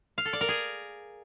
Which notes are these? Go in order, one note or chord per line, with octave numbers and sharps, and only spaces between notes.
F5
A4
D5
A#4
G#4